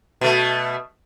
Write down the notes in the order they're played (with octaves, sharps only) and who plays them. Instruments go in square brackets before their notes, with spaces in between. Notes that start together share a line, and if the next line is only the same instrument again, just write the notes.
[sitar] B2 A3